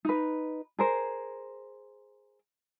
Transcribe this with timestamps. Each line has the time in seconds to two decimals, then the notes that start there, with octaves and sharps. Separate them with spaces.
0.05 D#4 B4
0.79 G#4 A#4 C5